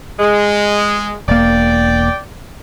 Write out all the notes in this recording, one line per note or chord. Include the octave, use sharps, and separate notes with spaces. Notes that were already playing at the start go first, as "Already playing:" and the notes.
G#3
E1 A#3 D5 G5